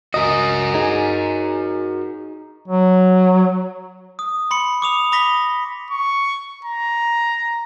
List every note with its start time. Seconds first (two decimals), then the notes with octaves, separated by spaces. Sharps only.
0.14 C#2 F#4 A#4 D#5
0.74 D#4 G#4
2.68 F#3
4.19 D#6
4.51 B5 C6 C#7
4.82 D6 D#6 F7
5.12 B5 D6 D#6 A#6 B6 G7
5.91 C#6
6.65 A#5